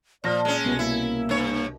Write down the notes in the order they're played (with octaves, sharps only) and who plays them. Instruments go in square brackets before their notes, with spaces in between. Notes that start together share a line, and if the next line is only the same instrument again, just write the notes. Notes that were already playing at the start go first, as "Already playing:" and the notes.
[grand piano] A#2 F6 A#6 [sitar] F3 [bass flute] D5
[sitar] G#3 C#4
[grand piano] C2 B2 [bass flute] B3
[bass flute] A#3 [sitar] E4
[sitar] G2 C#5